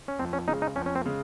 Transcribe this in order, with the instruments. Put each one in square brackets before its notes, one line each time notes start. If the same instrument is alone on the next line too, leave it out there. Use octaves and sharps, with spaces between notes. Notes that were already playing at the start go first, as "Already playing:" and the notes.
[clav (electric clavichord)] C#4
[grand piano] F2 [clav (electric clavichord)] C4
[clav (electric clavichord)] C#4
[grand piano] C#3 G#3 [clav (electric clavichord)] D#4
[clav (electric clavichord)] D#4
[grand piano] F2 [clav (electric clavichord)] C#4
[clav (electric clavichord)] C#4
C4
[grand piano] C#3 G#3